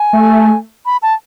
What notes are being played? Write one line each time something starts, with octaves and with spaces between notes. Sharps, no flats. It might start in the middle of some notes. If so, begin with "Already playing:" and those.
Already playing: G#5
A3
B5
A5